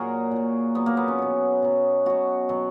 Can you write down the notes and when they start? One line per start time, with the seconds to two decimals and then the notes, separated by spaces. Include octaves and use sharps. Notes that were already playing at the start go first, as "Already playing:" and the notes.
Already playing: A#2 F#3 F#4 G#4 A#4
0.31 A#2 F#3
0.75 A#2 F#3 B3
0.86 A#3
0.97 B3
1.08 C#4
1.18 B2 F#3
1.62 B2 F#3
2.06 B2 F#3 F#4
2.49 B2 F#3